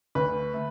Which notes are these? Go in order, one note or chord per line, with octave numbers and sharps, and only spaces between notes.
D2 B4
A3